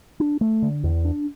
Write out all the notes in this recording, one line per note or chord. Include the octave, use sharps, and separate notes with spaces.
D4
A3
D3
E2
D4